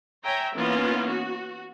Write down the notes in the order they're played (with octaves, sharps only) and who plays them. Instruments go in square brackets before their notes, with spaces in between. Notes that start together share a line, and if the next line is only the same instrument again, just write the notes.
[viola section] C#5 E5 G5 G#5 A#5
E3 A#3 B3 C#4 D#4 F4
F#4